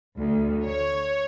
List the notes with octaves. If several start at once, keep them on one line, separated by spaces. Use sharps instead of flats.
D2
C#5